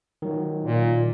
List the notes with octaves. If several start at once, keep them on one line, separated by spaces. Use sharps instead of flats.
D#3 F#3
A#2